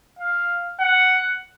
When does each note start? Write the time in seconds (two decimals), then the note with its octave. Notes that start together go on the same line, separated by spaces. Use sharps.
0.19 F5
0.80 F#5